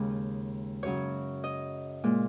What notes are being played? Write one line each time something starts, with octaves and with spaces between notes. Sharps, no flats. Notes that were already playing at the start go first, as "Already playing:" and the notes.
Already playing: D#2 C#3 G#3
F#2 C#3 F#3 C#5
D#5
A#2 G#3